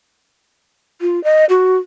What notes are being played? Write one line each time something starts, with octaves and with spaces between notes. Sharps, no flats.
F4
D#5
F#4